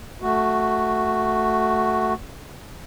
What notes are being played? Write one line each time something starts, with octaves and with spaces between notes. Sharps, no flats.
A3 F#4